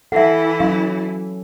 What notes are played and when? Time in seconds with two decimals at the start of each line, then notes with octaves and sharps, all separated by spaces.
0.12 E3 E4 A4 E5 F#5
0.60 F#3 C#4 F5 C6